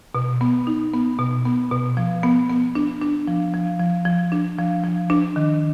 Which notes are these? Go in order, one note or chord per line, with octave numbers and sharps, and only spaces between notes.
B2
B3
D#4
B3
B2
B3
B2
F3
B3
B3
D4
D4
F3
F3
F3
F3
D4
F3
F3
D4
D#3